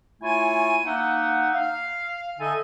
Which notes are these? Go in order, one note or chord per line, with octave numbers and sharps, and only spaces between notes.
A3 E4 F4 C#5 G#5
A#3 D#4 E5 F#5
F5
D3 D#4 A4 D#5 E5 G#5